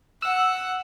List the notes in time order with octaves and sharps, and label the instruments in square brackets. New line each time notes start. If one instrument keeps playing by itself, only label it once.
[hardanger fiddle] F#5 [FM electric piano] E6